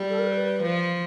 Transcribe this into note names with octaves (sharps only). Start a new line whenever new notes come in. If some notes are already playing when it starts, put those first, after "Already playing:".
Already playing: G3
A4
A#4
B4
F3